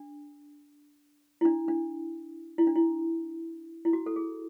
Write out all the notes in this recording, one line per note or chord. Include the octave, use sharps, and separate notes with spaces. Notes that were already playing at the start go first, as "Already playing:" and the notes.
Already playing: D4
E4
D4
D4
E4
D4
E4
E4
F#4
A4
G#4